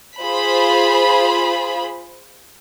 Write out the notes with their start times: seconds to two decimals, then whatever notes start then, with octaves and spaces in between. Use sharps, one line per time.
0.20 F4 G#4 C5 B5